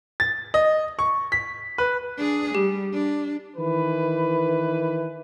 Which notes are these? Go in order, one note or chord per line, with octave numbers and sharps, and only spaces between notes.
A6
D#5
C#6
B6
B4
D4 G#4
G3 G4
D4
D#3 E3 B4